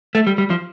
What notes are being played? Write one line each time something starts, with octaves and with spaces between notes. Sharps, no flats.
A3
G3
G3
F3